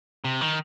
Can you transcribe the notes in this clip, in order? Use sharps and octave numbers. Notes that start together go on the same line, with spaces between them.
C3
D#3